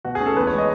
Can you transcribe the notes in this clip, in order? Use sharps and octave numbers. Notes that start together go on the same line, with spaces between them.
B2 F#4
G#4
C#4
A4
E2 B4
C#5
G#3
D#5